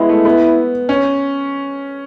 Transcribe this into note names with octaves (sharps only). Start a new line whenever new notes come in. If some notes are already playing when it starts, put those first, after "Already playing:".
Already playing: G#3 B3 E4
A3
B3
C#4